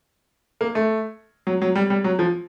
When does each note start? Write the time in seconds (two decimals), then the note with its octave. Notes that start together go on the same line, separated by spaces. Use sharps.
0.61 A#3
0.75 A3
1.47 F#3
1.62 F#3
1.76 G3
1.90 G3
2.04 F#3
2.19 F3